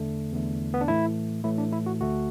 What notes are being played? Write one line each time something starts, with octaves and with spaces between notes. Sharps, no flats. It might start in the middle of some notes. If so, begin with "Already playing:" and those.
Already playing: E2 D3 A3
E2 D3 A3
B3
D4
A2 E3 A3 E4
A2 E3 A3 E4
D4
E4
F#4
D2 D3 A3 F#4